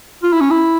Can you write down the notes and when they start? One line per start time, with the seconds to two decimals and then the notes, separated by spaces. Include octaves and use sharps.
0.23 F4
0.33 E4
0.41 C#4
0.51 E4